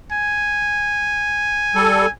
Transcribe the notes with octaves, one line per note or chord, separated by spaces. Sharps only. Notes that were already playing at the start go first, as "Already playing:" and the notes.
G#5
G3 A4